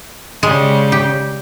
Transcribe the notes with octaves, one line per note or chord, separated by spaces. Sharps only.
C#3 G3 G#3
G4